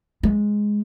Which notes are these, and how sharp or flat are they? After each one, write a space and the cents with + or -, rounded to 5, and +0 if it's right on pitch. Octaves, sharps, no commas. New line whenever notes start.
G#3 +0